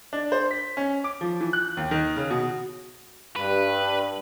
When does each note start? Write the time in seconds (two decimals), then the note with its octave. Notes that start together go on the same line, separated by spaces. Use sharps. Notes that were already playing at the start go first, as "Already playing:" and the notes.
0.13 D4
0.32 C5
0.51 B6
0.77 C#4
1.04 D6
1.21 F3
1.41 E3
1.53 F#6
1.77 D#2
1.91 D#3
2.16 C#3
2.30 B2
3.36 G2 B4